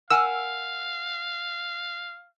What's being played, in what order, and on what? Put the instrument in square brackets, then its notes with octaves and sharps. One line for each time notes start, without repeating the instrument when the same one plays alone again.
[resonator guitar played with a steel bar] A#4 F#5 G#5 [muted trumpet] F5 [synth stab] E6